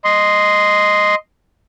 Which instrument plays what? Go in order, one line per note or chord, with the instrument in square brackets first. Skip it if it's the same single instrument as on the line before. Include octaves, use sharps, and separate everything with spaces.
[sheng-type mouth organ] D#5 C6